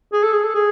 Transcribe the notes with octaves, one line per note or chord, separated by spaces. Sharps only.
G#4
A4
G#4
A4
G#4